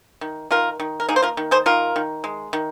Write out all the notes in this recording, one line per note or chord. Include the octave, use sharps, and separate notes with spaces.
D#3
D#3 F4 A#4
D#3
A#4
A#3 D#4 G#4
C5
F4 A#4
D#3
G#4 C5
D#3 F4 A#4
D#3
G#3
D#3